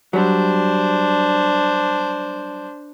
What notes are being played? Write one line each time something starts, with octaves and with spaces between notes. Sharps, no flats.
F#3 G3 D4 C5